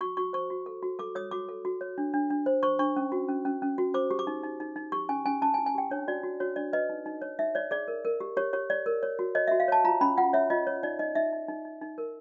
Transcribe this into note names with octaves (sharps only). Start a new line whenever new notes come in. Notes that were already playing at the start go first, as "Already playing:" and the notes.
F#4 C#6
F#4 C#6
C5 C#6
F#4
A4
F#4
A4 D6
C#5 D#6
F#4 D6
A4
F#4
C#5
D4
D4
D4
C5
C5 C#6
D4 C#6
C#4
F#4
C#4
C#4
C#4
F#4
C5 D6
G4
D6
D#4
D#4
D#4
D#4
G4 C#6
C#4 G#5
C#4 G#5
C#4 A5
G#5
E4
G#5
G4 G5
D4 C#5
F#4 D5
F#4
F#4 C#5
D4 D5
B4 D#5
D#4
D#4
C#5
D#4 E5
C#5 D5
G#4 D5
A#4
A#4
G4
G4 C#5
G4 C#5
C#5 D5
A#4
C#5
F#4
C#5 D#5
E5
F#4
F5
C#5 A5
F4 A#5
C#4 B5
F4 F#5
C#5 E5
F4 D#5
C#5
D#4 D5
D#4 D#5
D#4 E5
D#4
D#4
D#4
D#4
A#4